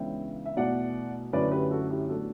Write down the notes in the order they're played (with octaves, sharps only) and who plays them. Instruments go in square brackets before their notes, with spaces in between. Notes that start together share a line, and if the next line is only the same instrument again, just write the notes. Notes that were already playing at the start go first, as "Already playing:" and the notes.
Already playing: [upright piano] C#2 C#3 E3 B3 D4 E5 G5
E5
E2 B2 A3 D5 F#5
F#2 D3 A3 C#4 E4 B4 D5
G4 B4
F#4 A4
E4 G4
A2 F#3 B3 D4 F#4 A4